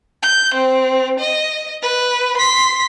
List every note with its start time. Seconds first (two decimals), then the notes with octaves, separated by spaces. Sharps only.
0.22 G6
0.54 C4
1.19 D#5
1.82 B4
2.37 C6 B6